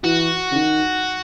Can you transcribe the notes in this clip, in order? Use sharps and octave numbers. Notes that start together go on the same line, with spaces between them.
E3 F#4
C#3
D#3